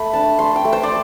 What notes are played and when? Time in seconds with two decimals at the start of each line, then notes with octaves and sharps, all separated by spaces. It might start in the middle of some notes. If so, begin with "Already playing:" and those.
Already playing: A3 B5
0.13 D4 A5
0.39 A3 C6
0.56 G5
0.65 A3
0.73 C5
0.83 D5